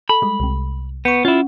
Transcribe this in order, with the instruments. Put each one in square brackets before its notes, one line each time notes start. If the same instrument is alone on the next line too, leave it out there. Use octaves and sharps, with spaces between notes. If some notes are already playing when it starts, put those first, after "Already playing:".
[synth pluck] A4 [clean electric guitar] B5
[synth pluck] G3 G#3
C2 C3
[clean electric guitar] B3 [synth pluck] C#6 G6
[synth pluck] C#4 F#5 [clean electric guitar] E4 F4